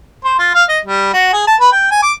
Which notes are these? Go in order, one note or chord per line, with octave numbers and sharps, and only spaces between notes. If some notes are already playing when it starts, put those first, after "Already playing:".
C5
F4
F5
D#5
G3
F#4
G#4
A5
B4
G5
G#5
D6